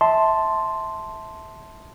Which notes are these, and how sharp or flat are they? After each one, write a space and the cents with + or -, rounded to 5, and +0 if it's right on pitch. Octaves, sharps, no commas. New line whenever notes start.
E5 -20 A5 +0 C6 +0